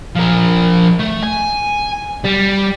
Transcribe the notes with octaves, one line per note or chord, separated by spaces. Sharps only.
F3 A#4
A3
G#5
G3